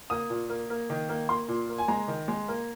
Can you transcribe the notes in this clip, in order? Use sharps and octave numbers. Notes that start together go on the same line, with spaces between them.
A#3 D#6
A#2
A#3
A#3
D#3
A#3
A#3 C6
A#2
A#3
G#5
G#3 A#5
D#3
G#3
A#3